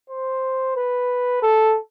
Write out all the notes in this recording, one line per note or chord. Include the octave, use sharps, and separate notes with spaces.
C5
B4
A4